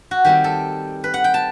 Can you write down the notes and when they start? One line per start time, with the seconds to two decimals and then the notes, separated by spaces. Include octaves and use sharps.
0.11 F#4
0.25 D#3 G3 C4 G4
0.44 A4
1.04 B4
1.14 F#5
1.24 G5
1.34 A5